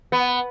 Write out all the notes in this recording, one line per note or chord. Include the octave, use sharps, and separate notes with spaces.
B3